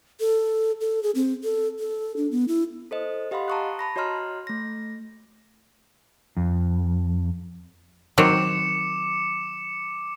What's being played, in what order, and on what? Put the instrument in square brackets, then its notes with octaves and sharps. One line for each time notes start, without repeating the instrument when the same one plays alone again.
[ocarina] A4
A4
G#4
C4
A4
A4
D4
B3
E4
[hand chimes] A4 C5 D#5
G4 D#5 F5 F#5 B5 C6
A5 A#5 C6 C#6 D#6 F#6
A5 B5 A#6
F#4 C#5 D#5 A#5 C6 F6
A3 A#6
[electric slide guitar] F2
[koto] D#3 F#3 C4 [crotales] D6 C#7 E7